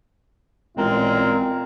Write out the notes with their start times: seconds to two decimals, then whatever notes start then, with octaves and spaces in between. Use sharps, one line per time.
0.77 A1 A#2 G#3 C4 F4 A#4